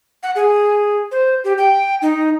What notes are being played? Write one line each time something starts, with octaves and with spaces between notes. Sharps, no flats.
F#5
G#4
C5
G4
G5
D#4